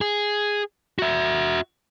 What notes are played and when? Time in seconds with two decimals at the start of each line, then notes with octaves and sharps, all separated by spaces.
0.01 G#4
0.99 F#4 E5